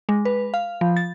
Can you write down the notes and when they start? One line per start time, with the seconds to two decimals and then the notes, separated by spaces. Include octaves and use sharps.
0.09 G#3
0.25 B4
0.54 F5
0.81 F3
0.96 A6